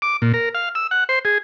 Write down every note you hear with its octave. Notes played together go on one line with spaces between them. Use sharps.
D6
A#2
A#4
F5
E6
F#5
C5
G#4